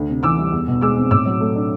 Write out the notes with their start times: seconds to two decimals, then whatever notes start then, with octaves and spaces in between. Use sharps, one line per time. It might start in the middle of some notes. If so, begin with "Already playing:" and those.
Already playing: D2 A3
0.09 C3
0.23 E3 D6 E6
0.38 G3
0.52 E2
0.68 B2
0.81 G#3 D6 E6
0.96 C4
1.11 A2 D6 E6
1.26 F#3
1.40 A3
1.56 D4